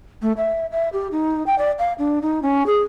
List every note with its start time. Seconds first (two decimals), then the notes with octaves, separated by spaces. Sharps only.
0.22 A3
0.37 E5
0.72 E5
0.93 G4
1.12 D#4
1.46 G5
1.59 D5
1.79 F5
1.99 D4
2.22 D#4
2.43 C#4
2.66 G#4